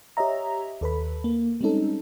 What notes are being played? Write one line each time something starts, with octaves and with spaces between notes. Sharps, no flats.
G4 C#5 D#5 E5 A#5
D#2 A4 B4 B5
A#3
G3 G#3 C4 C#4 D#4 A4